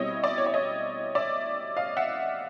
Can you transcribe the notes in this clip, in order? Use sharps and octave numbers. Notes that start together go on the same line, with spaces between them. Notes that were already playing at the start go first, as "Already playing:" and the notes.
Already playing: B2 G3 C4 E4 C#5 D#5
D5 E5
C#5
D5
C#5 D#5
D5 E5
D#5 F5
E5 F#5